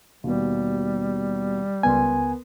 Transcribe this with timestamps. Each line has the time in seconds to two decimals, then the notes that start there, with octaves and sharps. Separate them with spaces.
0.24 D#2 B2 G3
1.83 C#2 B3 A#4 G#5 C6